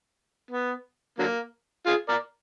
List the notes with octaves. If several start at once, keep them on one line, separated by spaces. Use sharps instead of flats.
B3
D3 F#3 A#3
F4 G#4
A#4 D5